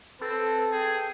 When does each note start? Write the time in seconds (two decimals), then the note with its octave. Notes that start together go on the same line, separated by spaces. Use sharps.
0.21 C4 A4 B4
0.72 G#4 G5